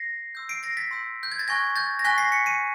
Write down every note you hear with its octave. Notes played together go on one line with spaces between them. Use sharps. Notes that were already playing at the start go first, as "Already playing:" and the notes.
Already playing: A#6 C7
C6 E6 G6
C7 D7
A#6 C7
A6 B6
C6 E6 G6
G6
G#6
A6
G#5 C#6 F#6 G#6 A#6
G6 A6
A#6
G#5 C#6 F#6 A6 B6
A#6 C7
B6 C#7
C#7 D#7